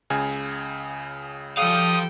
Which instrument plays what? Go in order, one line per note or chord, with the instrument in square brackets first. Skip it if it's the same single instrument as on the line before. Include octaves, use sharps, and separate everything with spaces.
[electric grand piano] C#2 C#3 G#5
[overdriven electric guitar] F3 F5 [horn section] G3 A4 G5 [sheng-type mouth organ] D#6